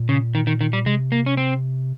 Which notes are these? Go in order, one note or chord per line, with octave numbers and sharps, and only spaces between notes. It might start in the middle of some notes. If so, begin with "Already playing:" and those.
Already playing: A#2
C#3
D#3
D#3
D#3
G3
C3 G#3
A#3
C#4
C4